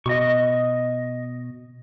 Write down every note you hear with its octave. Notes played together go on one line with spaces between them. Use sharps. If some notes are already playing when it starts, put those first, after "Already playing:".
B2 D#5 C#6